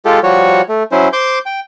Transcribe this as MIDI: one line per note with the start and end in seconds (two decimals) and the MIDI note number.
0.05 0.19 56
0.05 0.19 65
0.05 0.19 67
0.05 0.19 69
0.23 0.62 53
0.23 0.62 55
0.23 0.62 66
0.23 0.62 73
0.69 0.83 57
0.92 1.08 54
0.92 1.08 61
0.92 1.08 64
0.92 1.08 72
1.13 1.39 72
1.13 1.39 84
1.13 1.39 86
1.13 1.39 91
1.46 1.60 79